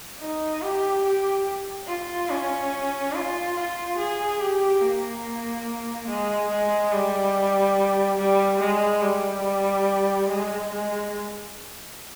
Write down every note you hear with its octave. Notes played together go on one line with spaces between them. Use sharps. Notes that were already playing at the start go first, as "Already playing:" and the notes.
D#4
G4
G4
F4
C#4
F4
F4
G#4
G4
A#3
G#3
G#3
G3
G3
G#3
G3
G#3
G#3